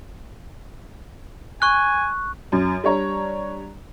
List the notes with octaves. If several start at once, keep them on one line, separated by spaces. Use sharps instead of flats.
G#5 C#6 F#6
F#2
G3 D4 C#5 A#5